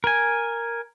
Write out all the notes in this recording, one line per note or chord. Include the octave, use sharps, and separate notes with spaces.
A#4 G#5